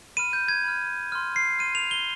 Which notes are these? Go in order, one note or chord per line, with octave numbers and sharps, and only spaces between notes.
B5 F6 D#7
G6
G#6
B5 F6
C6 F6
C7
C6 F6 D#7
F7
G7